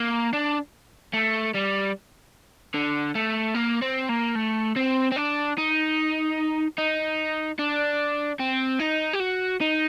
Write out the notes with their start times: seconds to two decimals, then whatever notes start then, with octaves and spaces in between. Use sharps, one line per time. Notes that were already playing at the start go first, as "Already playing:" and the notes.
Already playing: A#3
0.33 D4
1.13 A3
1.54 G3
2.74 D3
3.15 A3
3.55 A#3
3.82 C4
4.09 A#3
4.35 A3
4.76 C4
5.12 C4
5.16 D4
5.58 D#4
6.78 D#4
7.59 D4
8.40 C4
8.79 D#4
9.13 G4
9.20 F#4
9.61 D#4